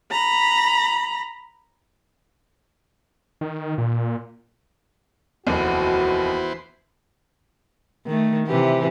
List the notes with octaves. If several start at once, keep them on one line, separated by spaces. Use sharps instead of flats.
A#5 B5
D#3
A#2
F1 D#2 E3 B3 F#4 C5
D#3 A3
C3 E3 G4